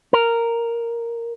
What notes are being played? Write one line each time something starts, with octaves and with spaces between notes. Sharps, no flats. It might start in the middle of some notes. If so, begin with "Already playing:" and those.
A#4